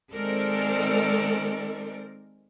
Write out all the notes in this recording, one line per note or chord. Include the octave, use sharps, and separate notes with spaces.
D#3 G#3 C4 A4 A#4 D5